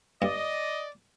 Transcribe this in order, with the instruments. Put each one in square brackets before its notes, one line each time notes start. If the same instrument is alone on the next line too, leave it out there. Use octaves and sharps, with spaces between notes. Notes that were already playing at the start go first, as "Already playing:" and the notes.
[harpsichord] G2 [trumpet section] D5 D#5